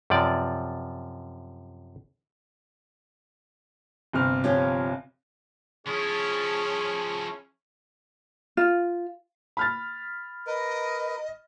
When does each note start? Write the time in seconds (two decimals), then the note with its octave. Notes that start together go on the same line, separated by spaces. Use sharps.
0.10 F#2 C3 F3 D5
4.13 G1 C3 F6
4.44 F3 C#4 G4
5.87 F3 C#4 E4 G#4
8.57 F4
9.57 B5 F6 A6
10.47 A#4 B4 D#5